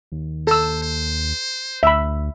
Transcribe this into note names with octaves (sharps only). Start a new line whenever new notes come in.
D#2
A4 C5 E6
C5
D2 E5 B5